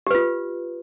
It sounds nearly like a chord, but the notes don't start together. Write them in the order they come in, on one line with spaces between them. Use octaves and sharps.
G4 B4 F4